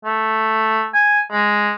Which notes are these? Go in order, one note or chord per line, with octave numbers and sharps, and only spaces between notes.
A3
G#5
G#3